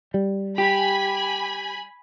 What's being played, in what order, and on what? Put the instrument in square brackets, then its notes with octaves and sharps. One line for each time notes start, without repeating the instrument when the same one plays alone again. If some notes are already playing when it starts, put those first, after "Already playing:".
[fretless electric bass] G3
[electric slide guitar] G4 [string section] G#5 B5